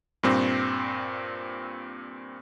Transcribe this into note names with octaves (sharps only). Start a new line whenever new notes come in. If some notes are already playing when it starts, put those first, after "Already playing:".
G2 A#2 C4